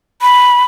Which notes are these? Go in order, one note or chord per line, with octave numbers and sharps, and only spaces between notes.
B5